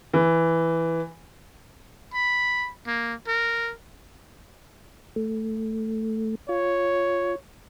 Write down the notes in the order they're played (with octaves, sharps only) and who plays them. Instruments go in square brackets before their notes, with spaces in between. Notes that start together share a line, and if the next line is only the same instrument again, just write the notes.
[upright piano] E3
[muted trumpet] B5
A#3
A#4
[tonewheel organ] A3
[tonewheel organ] F4 [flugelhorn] C#5